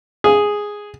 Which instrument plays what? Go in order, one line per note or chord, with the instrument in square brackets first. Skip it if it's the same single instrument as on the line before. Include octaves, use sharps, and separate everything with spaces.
[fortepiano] G#4